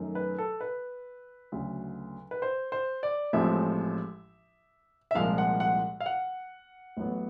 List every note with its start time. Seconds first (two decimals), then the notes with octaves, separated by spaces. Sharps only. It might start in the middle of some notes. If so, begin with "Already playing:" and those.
Already playing: F#2 D#3 F#3 A3
0.15 B4
0.38 A4
0.61 B4
1.52 D2 C#3 F#3
2.31 B4
2.42 C5
2.72 C5
3.03 D5
3.33 A1 A2 F3 G#3 C4 E5
5.11 E5
5.15 C2 A#2 F3 G#3 F5
5.38 F#5
5.60 F#5
6.00 F5
6.06 F#5
6.97 A1 A2 F#3 B3